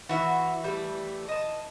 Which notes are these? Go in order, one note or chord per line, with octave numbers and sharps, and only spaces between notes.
E3 F#4 E5
G3 A3
D#5 A5